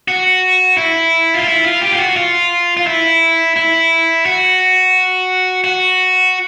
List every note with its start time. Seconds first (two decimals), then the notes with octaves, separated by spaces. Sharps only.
0.08 F#4
0.77 E4
1.34 F4
1.47 E4
1.65 F4
1.82 G4
1.92 F4
1.99 F#4
2.16 F4
2.77 F4
2.87 E4
3.56 E4
4.26 F#4
5.64 F#4